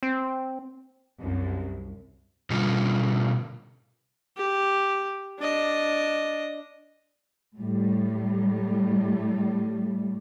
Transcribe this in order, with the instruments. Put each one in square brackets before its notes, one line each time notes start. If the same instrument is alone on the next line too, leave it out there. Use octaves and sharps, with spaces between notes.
[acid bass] C4
[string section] C2 F#2
[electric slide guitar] B2 D3 G3 F4
[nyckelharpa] G4
D4 D#5
[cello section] A2 G3